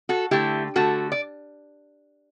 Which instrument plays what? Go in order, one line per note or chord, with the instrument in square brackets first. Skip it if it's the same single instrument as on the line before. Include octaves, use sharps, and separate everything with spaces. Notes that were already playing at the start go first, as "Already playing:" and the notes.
[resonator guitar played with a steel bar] F#4 A4
D3 A3 E4 G4
D3 A3 F#4 A4
D5